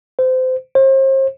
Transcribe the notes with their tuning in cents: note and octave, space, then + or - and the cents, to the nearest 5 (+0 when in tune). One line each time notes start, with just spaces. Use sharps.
C5 -25
C5 +40